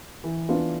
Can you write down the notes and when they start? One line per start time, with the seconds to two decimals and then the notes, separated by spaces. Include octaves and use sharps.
0.24 E3
0.49 B3 D4 F4